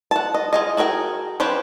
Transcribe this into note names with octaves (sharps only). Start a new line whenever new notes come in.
F#5 A5
D#5
F4 G#4 D#5
F#4 G#4 A#4 D#5 G5
F3 C#4 G4 B4 C5